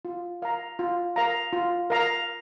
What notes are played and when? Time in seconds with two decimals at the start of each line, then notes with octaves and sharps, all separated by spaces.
0.05 F4
0.42 A#4 F5 A#5
0.79 F4
1.16 A#4 F5 A#5
1.53 F4
1.90 A#4 F5 A#5